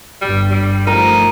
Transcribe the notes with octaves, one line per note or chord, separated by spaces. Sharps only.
G1 G2 G3
G3
F3 A3 D#4 A#4